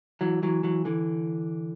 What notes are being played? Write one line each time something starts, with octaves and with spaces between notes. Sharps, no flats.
E3 F#3
E3 F#3
E3 F#3
D3 E3